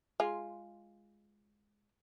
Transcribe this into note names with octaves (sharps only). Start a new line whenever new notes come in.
G#3 F4